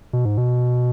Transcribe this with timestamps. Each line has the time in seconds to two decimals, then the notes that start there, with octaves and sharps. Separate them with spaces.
0.13 B2
0.25 G#2
0.38 B2